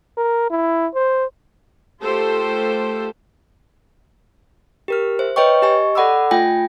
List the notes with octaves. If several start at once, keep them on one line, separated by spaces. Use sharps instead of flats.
A#4
E4
C5
A3 F4 G4 A4 C5
G4 A#4 F6
C5 E5
B4 C#5 D#5 G5 C#6
G4 D#5 G#5 C#6
A4 D5 F#5 B5 D6 E6
A3 F4 G5 G#5 A#6